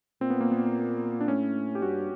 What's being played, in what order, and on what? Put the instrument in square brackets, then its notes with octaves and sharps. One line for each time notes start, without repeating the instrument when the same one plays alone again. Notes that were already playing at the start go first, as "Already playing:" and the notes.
[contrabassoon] A#2 [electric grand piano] C4
[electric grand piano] B3
A#3
B3
D4
[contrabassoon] A2 [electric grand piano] C#4
[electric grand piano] G4
[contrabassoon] G2 [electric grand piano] F#4